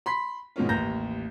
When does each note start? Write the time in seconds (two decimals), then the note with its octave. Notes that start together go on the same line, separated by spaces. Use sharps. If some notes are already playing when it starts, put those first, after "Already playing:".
0.06 B5 C6 B6
0.56 G#2 B2 D#3 A#3 C#4 F4
0.69 A1 D#2 A#5 G6 A#6